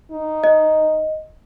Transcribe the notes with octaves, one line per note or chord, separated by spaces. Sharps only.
D#4
D#5